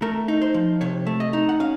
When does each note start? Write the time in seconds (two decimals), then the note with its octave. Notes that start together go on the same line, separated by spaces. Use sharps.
0.02 A3 A#4
0.28 D#4
0.42 C5
0.54 F3
0.81 C3 C#5
1.06 A3
1.20 D#5
1.33 D#4
1.49 F#5
1.60 C#4 F5